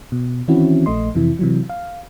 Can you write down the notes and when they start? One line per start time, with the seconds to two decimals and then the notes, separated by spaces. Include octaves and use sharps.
0.12 B2
0.48 D#3 E3 C4 C#4 E4 F#4
0.86 A#1 A3 D#5 C6
1.15 F2 C3 E3 E4
1.39 C3 E3 F#3
1.69 F5